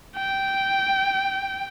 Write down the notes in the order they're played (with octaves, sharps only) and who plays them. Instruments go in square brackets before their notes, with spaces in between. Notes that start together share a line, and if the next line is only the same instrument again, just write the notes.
[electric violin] G5